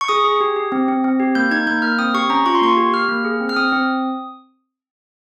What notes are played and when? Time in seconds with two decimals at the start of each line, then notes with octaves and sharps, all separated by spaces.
0.01 C#6
0.08 G#4 D#6
0.24 G#4
0.41 G4
0.56 G4
0.72 C4
0.88 C4
1.04 C4
1.20 G4
1.35 A#3 G6
1.51 D#4 G#6
1.67 A#3 G6
1.82 A#3 F6
1.99 C4 D#6
2.14 G4 C#6
2.30 C#4 A#5
2.46 F4 C#6
2.55 C6
2.61 A#3 C#6
2.77 G4
2.93 G4 F6
3.09 A#3
3.25 G#4
3.41 C4
3.49 F6
3.56 C4 D#6
3.72 C4